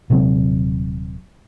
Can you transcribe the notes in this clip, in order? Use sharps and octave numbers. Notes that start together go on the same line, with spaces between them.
D#1 C3 F#3 C4